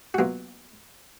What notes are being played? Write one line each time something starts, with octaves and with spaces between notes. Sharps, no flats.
F#4
B2 F#3 A#3 F4